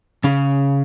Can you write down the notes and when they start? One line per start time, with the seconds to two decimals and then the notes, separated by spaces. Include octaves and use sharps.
0.24 C#3 C#4